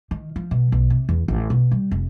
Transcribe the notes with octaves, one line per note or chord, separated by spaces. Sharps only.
D#3
F3
B2
B1
C3
E2
A1
B2
G3
F1